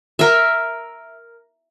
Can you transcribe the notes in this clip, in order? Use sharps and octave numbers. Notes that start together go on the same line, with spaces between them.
A#4 E5